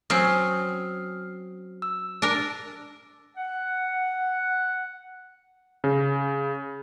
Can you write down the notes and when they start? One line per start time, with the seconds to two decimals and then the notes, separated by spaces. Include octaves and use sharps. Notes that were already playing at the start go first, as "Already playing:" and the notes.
0.10 F#3 C4 C#4 D#6 F6 C7
1.82 E6
2.22 D4 A#4
3.36 F#5
5.84 C#3